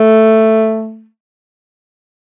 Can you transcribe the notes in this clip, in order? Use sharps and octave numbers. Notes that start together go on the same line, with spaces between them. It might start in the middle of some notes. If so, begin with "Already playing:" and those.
Already playing: A3